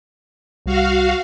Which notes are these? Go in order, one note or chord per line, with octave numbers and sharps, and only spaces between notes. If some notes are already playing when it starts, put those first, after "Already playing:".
C2 G3 F#4 F5